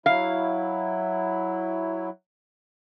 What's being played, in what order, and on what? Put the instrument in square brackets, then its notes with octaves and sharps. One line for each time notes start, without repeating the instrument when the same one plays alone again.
[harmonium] F#3 E4 [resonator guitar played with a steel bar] F5